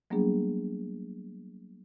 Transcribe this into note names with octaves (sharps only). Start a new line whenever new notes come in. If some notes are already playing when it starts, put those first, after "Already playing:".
F#3 G3 A#3 B3 D4 G#4